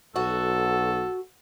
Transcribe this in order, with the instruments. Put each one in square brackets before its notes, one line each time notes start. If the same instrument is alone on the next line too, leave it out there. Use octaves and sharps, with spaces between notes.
[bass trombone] B1 [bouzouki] F#4 [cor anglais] A4